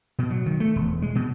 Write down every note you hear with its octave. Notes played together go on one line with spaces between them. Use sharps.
B2
F#3
D#3
A3
E1
G#3
B2